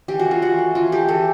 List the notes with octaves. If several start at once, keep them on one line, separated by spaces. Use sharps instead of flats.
E3 G4
F#4
A3
F4
E3 F#4
A3
E3 F4
A3 G4
E3 A4